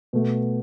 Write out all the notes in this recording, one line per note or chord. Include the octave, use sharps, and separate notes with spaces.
B2 A3